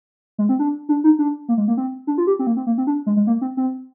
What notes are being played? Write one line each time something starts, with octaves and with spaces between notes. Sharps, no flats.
G#3
C4
D4
D4
D#4
D4
A#3
G#3
A#3
C4
D4
F4
G4
C4
A#3
C4
A#3
C4
D4
G#3
G#3
A#3
C4
C4